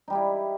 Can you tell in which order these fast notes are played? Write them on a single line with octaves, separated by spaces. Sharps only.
D#4 G3 G4 E4